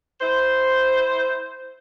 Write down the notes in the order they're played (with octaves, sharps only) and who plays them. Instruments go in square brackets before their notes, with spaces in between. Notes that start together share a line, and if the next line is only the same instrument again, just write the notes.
[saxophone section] E4 C5